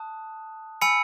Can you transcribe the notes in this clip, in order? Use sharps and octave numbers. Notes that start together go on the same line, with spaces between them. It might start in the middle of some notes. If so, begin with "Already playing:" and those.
Already playing: A5 D#6 F#6
G#5 B5 E6 C#7